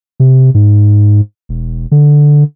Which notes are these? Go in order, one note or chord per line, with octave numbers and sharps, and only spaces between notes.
C3
G#2
E1
D3